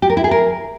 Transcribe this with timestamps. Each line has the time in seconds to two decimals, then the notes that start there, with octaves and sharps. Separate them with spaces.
0.02 G4
0.10 A#4
0.17 E4
0.24 G#4
0.31 A#4